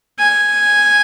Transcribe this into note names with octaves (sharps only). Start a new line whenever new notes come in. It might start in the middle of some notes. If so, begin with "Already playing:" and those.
G#5